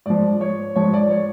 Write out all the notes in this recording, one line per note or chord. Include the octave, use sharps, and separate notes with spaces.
G#2 F3 D5
C#5
G#2 F3 C#5
D5
C#5